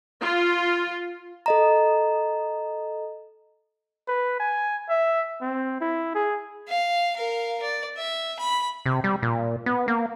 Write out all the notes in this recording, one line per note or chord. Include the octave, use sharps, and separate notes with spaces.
F4
A4 D#5 A#5
B4
G#5
E5
C4
E4
G#4
F5
A#4 F5
D5
E5
B5
C3
G3
A#2
B3
A#3